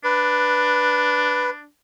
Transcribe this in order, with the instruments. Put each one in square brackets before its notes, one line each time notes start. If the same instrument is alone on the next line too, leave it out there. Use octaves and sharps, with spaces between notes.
[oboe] D4 [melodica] B4